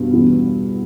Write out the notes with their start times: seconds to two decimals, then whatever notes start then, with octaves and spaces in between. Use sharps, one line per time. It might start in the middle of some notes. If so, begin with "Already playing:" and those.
Already playing: G2 B2
0.13 E2